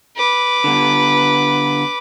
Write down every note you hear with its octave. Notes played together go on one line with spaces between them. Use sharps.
B4 D6
D3 B3